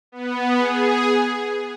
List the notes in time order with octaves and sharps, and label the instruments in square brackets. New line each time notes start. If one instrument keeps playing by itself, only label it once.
[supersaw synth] B3
G#4